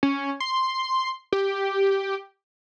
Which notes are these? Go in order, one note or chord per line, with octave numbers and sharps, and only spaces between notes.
C#4
C6
G4